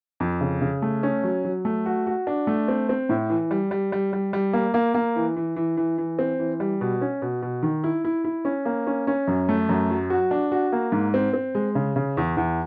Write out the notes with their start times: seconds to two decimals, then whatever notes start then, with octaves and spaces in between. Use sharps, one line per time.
0.20 F2
0.41 C#3
0.61 C#3
0.82 A3
1.03 C#4
1.23 F#3
1.45 F#3
1.65 A3
1.86 F#4
2.07 F#4
2.27 D4
2.47 A3
2.68 C4
2.89 C4
3.09 A2
3.30 E3
3.51 G3
3.71 G3
3.92 G3
4.13 G3
4.33 G3
4.53 A#3
4.74 A#3
4.94 A#3
5.16 E3
5.36 E3
5.56 E3
5.77 E3
5.98 E3
6.19 C4
6.39 E3
6.60 G3
6.81 B2
7.01 C#4
7.22 B2
7.42 B2
7.63 D#3
7.84 E4
8.05 E4
8.24 E4
8.45 C#4
8.65 A#3
8.87 C#4
9.07 C#4
9.28 F#2
9.49 A3
9.69 F#2
9.90 F#3
10.10 F#4
10.31 D4
10.52 F#4
10.72 A#3
10.92 G#2
11.14 C4
11.34 C4
11.55 G#3
11.75 C#3
11.96 C#3
12.17 E2
12.37 E2